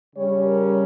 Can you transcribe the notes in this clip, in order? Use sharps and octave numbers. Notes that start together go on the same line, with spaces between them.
C#3 G3 C#4 C#5
A#4